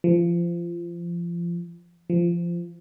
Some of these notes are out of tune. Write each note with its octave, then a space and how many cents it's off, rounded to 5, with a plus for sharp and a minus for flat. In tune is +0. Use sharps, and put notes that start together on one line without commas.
F3 -25
F3 -20